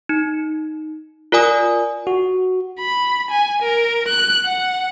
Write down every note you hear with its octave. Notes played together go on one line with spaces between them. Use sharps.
D#4
F4 A#4 D5 G#5 D#6
F#4
B5
G#5
A#4
F#6
F#5